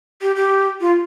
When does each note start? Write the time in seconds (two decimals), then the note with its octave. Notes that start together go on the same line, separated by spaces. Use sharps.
0.22 G4
0.36 G4
0.81 F4